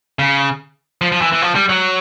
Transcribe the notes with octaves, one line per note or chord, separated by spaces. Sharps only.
C#3
F3
F3
E3
E3
F3
G3
F#3